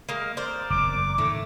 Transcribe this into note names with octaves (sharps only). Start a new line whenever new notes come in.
G#3 A#3
A#4 C5 D5
F#1 E2 D6
A2 D#3 A3